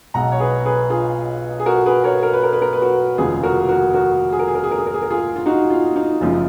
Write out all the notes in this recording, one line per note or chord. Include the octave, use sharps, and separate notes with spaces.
B1 B2 G#3 F#5 A#5
C#5
G#4 B4
G#4 B4
F4 G#4
G#4
F#4 A#4
G#4 B4
A#4 C#5
A#4
B4
A#4
B4
A#4
B4
F#4 A#4
F1 D#2 C#3 G#3 F4 G#4
F#4 A#4
F#4 A#4
F#4 A#4
G#4
A#4
G#4
A#4
G#4
A#4
G#4
A#4
G#4
A#4
F4 G#4
F4
D#4 F#4
F4
D#4
F#1 F#2 F3 G#3 F4